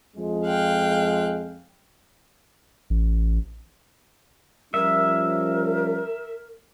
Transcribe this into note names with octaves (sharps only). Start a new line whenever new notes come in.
F2 F3 G#3
F5 G5 F#6
A1
F3 G3 C#4 A#4 E5